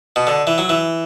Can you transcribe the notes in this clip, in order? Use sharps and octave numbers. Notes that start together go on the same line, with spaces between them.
B2
D3
E3
F#3
E3